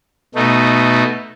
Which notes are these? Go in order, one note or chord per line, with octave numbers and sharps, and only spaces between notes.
B2 A3 D#4